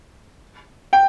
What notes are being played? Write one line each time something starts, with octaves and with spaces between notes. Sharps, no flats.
G5